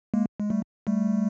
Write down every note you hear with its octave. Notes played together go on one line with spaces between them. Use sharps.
G#3 A#3
G#3
G3 A3
G3 A3